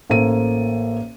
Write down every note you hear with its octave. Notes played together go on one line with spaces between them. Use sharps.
A1 A#3 A4 C5 D#7